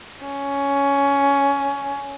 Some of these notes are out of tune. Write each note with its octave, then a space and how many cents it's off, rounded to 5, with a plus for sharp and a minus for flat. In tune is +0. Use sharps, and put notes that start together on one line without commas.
C#4 +10